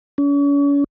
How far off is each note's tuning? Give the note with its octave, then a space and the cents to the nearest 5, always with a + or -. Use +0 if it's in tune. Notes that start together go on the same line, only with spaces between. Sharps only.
C#4 +40